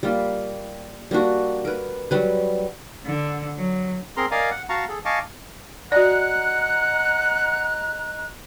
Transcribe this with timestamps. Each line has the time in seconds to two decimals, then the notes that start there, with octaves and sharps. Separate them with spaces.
0.03 G3 A#3 F4
1.11 G3 A#3 D4 F#4
1.65 A#4 B4
2.11 F#3 G3 B4
3.06 D3
3.57 F#3
4.17 C4 G#4 A#4 A#5 C6
4.31 A#4 D5 D#5 F5 G#5 A#5
4.51 F#5
4.69 F#4 F5 A5 A#5 C#6
4.89 G#4 A4
5.05 D#5 F5 G#5 A5 C#6 D6
5.92 F#4 D5 D#5 F#5 A#5 F#6